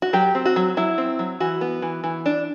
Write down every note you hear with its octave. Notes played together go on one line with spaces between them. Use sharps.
F#4
F#3 G4
C4
F#4
F#3
F#3 E4
C4
F#3
E3 F#4
B3
E3
E3
D4